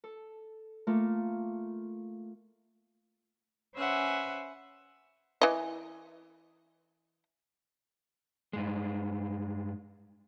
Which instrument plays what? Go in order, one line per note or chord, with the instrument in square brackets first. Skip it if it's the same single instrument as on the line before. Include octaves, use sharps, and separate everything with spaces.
[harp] A4
A3 A#3 F4
[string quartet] C#4 B4 C5 E5 F#5 G#5
[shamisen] E3 D#5
[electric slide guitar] G2 G#3